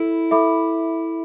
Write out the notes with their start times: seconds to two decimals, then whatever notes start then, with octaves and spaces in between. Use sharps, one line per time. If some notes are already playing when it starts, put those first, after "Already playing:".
Already playing: E4 A4
0.31 A4 E5 B5 D6